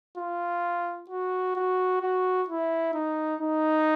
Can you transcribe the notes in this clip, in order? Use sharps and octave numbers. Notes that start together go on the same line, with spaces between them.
F4
F#4
F#4
F#4
E4
D#4
D#4